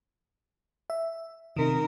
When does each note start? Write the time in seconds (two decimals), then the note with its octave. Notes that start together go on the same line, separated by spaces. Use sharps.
0.90 E5
1.56 C3 D#3 D#4 A#4